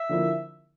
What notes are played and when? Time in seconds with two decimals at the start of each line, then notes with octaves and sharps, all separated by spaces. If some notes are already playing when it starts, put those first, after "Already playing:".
Already playing: E5
0.09 D3 F3 A#3 E4